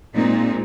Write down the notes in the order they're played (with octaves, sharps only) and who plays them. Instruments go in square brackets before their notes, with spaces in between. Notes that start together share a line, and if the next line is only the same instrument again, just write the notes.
[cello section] A#2 G#3 C4 D#4